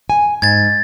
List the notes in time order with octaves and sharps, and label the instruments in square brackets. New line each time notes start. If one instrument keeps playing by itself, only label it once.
[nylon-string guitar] G#5
[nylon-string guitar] G#2 [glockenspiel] G#6 A6